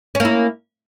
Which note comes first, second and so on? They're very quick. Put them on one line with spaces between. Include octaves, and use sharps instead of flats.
C#4 A#3 E4